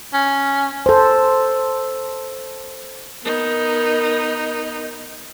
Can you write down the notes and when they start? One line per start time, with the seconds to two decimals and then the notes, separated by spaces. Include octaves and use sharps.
0.13 C#4
0.86 A4 C5
3.25 B3 D#4 A#4